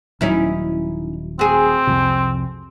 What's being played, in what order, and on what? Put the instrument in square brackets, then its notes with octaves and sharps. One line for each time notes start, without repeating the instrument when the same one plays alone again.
[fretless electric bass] D#1 F#3 [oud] C#4 D#4 E4
[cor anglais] C4 [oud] F#4 G#4
[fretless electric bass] C2 F2 C3